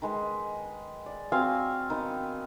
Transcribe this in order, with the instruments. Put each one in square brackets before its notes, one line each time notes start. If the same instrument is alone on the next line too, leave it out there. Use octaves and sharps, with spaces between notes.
[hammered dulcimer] D#3 G#3 B4
D5
[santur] C4 F5 G#5 [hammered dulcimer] F#4
[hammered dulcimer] D#3 B3